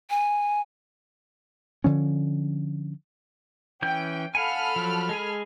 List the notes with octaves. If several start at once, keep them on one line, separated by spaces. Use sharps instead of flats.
G#5
D3 F3 C#4
E3 C#4 G5 G6
A4 F5 F#5 G#5 B5 F6
F3 F#3
G#3 G#4 G#5